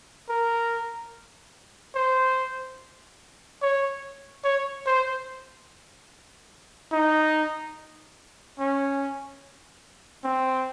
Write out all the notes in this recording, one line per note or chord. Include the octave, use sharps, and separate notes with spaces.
A#4
C5
C#5
C#5
C5
D#4
C#4
C4